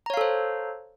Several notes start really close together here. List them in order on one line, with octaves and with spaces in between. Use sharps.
A#5 C#5 F5 A4 C5